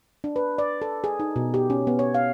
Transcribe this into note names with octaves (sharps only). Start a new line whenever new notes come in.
D4
B4
D5
A4
G#4
D#4
B2
G4
C#4
B3
C#5
F5